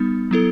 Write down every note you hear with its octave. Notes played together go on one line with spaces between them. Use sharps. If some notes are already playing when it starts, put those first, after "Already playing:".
Already playing: G3 B3 D#4
F#3 B3 E4 A4